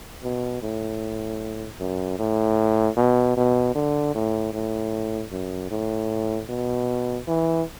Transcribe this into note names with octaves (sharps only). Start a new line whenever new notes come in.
B2
A2
F#2
A2
B2
B2
D3
A2
A2
F#2
A2
B2
E3